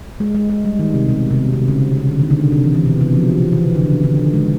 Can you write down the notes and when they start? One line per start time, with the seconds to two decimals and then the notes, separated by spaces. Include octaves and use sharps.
0.20 G#3
0.35 G#3
0.50 G#3
0.65 G3
0.79 D#3
0.94 C3
1.09 B2
1.30 C3
1.53 C3
1.68 C#3
1.97 C3
2.09 D3
2.20 D#3
2.30 D3
2.42 C3
2.52 C3
2.64 E3
2.75 E3
2.86 B2
3.01 C3
3.15 F3
3.30 E3
3.52 E3
3.75 D3
3.90 C#3
4.04 D3
4.18 D#3
4.33 G#3